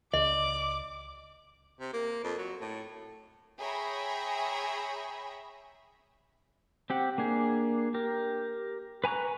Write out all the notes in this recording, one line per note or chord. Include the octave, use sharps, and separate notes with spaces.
C#2 D5 D#5 D6
C3
A#3
F2
F#3
A2
G#4 C#5 E5 G5 A#5 B5
C4 G4 F#5
A#3 D4 G#4
G4 A#4
B4 G#5 A#5 C#6 F#6